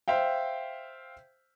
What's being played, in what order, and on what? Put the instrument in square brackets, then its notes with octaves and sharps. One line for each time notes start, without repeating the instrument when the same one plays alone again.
[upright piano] C5 E5 F5 G5